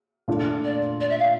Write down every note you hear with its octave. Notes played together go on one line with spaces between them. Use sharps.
A#2 A3 D4 F4
D5
D5
E5
F5